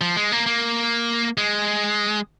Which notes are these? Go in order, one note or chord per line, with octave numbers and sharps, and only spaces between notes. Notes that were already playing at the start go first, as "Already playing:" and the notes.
F3
G#3
A#3
A#3
G#3